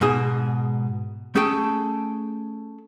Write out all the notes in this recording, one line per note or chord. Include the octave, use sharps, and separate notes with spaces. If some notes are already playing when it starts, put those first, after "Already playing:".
G#2 B2 G#4
A3 C#4 G#4 A4 G5